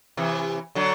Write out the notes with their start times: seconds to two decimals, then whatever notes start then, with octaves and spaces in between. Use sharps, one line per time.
0.17 C3 E3
0.75 D3 F#3